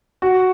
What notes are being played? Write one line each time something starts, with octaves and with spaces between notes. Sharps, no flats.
F#4